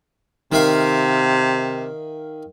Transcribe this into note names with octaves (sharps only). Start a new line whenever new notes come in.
C3 D#3 E5 F5